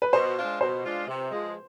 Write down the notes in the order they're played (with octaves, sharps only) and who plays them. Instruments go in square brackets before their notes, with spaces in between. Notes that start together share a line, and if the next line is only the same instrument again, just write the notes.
[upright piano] B4
[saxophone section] B2 [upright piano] C5
[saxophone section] G#3 D4 F4
[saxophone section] B2 [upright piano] C5
[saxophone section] G#3 D4 F4
C3
F3 G#3